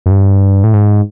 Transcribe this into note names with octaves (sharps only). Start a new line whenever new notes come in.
F#2
G2
A2
G#2